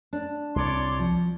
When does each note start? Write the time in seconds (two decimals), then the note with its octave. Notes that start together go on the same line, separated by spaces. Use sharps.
0.13 D4
0.56 C2 C#5 D5 C6
0.99 F3